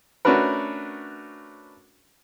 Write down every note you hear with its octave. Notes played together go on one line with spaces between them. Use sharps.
A3 C#4 D4 F#4 A#4 B4